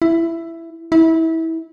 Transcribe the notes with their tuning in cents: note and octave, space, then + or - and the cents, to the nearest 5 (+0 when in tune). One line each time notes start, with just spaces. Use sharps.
E4 +10
E4 -25